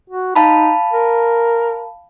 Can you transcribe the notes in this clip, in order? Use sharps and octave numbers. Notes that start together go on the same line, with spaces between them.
F#4
D#4 F5 A5 B5
A#4